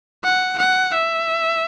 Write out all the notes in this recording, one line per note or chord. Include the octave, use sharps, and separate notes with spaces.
F#5
F#5
E5